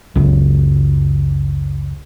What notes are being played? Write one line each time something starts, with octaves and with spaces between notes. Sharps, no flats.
F#1 C#2